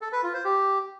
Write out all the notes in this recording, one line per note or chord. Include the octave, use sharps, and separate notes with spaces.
A4
B4
F4
C5
G4